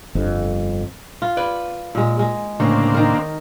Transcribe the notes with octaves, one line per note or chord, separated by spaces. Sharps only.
G1 F2
F4
B4 D5
A#2 G#3
G#3
D2 A2 C#3 A#3 C4 D4 C#5
D#3 A#4